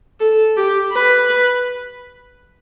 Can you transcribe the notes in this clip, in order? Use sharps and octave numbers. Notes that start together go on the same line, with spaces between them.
A4
G4
B4